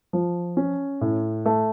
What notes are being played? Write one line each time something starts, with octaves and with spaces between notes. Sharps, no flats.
F3
C#4
A2
A3